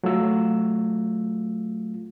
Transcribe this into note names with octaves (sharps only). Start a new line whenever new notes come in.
F#3 A3 F4 E6